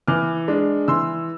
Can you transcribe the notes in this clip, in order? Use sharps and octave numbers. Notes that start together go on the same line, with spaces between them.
E3 D6 F6
G#3 D4
E3 C6 E6